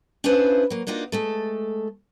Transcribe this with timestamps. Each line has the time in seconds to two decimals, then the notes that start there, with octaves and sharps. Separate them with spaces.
0.24 C#4 D4 E4 F4 B4 C5
0.70 F#3 A#3
0.87 A#3 D4 D#4 F4 F#4
1.12 G#3 A3 A4